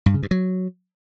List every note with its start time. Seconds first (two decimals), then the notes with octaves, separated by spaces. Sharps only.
0.06 G2
0.14 C#3
0.23 G2
0.31 F#3